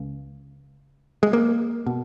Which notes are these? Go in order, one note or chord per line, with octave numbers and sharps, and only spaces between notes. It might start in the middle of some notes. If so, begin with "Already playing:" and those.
Already playing: C#2 C#3
G#3
A#3
B2